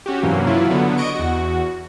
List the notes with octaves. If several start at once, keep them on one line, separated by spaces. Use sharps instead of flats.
C#4 F#4 G4
G2 C3 E3 F#3 A#3 C#4
C#3 E3 F#3 E4 F4
D3 F#3 B3
D#5 C#6 D7
E2 F#4